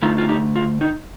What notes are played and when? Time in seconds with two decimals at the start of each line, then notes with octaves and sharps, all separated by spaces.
0.02 D3 A3 D#4 F4
0.18 F4
0.28 D#4 G4
0.56 F4
0.81 D#4